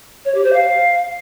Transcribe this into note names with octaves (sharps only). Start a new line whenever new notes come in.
C#5
G4
C5
F5